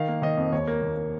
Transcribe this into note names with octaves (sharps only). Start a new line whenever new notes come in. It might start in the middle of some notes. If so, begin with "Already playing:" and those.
Already playing: D#3 F5
A#3
D#3 D#5
F2
D#2 C#5
A#3
D#2
A#3